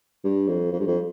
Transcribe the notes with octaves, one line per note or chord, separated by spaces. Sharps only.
G2
F2
F2
G2
F2